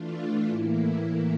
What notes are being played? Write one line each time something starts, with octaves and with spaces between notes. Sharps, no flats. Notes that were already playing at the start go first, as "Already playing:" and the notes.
Already playing: E3 A3 D4 F4
A2 E3 A#3 E4